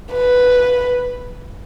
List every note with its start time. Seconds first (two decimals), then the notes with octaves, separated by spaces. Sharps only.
0.13 B4